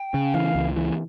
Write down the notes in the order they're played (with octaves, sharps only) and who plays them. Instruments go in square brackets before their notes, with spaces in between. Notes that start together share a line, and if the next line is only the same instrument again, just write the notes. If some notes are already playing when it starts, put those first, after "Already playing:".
Already playing: [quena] G5
[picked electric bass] C#3
[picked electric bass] E3 [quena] F5
[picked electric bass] C#2
E3